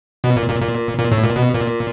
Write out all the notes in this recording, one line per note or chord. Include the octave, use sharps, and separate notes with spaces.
B2
A#2
A#2
A#2
A#2
A2
A#2
B2
A#2